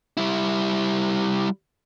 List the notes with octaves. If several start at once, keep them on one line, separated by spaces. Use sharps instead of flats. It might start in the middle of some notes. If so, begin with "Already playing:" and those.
G3 E4